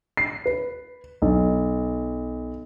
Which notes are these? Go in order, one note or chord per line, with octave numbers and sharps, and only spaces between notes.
C7
B4
B1